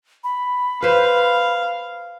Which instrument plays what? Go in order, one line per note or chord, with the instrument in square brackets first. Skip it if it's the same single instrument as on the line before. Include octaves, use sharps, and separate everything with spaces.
[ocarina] B5
[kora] B4 C5 [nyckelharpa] F5